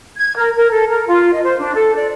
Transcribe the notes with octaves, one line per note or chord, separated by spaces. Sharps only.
G#6
A#4
A#4
A4
A#4
F4
D#5
C5
D4
A4
D5